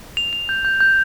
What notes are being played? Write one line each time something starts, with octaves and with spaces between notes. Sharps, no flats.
F7
F7
G6
G6
G6